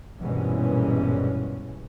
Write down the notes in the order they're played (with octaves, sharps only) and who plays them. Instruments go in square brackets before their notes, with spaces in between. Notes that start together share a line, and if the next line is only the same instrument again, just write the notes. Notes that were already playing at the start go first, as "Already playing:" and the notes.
[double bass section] A#1 G2 B2 E3 G#3 C#4